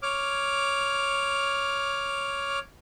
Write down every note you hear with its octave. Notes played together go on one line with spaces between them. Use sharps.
C#5 D6 F6